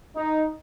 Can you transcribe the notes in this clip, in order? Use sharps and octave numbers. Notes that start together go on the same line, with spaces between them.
D#4